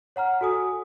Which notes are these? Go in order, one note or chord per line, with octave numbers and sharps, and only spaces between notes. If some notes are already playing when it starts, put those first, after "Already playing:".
C#5 F#5 A#5 F6
F#4 A4 G#5 D#6